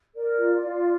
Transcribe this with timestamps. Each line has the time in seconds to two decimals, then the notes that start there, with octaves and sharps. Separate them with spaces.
0.15 A#4 D5
0.38 F4
0.61 F4